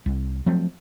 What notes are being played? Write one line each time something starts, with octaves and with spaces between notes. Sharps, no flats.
C2
F3 F#3 A3 C4